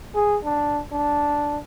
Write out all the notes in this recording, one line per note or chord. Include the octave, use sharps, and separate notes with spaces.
G#4
D4
D4